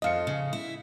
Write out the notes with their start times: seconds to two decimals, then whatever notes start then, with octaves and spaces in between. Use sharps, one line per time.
0.02 F2 F4 D#5 F5 C#7
0.27 C#3
0.53 E4